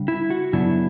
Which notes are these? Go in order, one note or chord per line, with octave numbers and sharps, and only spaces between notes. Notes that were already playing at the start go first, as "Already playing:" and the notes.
Already playing: C#3 G3 D4
E4
F#4
F#2 C#3 F#3 B3 D4 E4